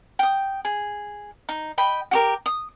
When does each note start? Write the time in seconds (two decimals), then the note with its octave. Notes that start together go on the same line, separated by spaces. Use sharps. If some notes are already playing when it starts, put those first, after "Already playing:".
0.19 G5 D#6
0.65 G#4
1.49 D#4
1.78 D#5 G5 B5
2.11 F#4 G4 A#4
2.46 D#6